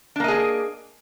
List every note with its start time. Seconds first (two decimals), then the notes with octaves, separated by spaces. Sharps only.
0.16 D4
0.20 A#3
0.24 D#5
0.28 G#4